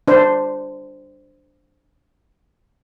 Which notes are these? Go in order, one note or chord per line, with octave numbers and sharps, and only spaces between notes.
D4 C5